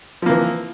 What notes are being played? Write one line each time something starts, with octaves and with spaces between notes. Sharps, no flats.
E3 F3 A#3